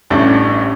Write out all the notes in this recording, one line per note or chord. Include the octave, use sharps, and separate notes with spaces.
A1 A2 G3 D4